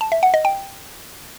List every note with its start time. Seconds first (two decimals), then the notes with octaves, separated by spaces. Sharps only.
0.01 A5
0.12 E5
0.23 F#5
0.34 D#5
0.45 G5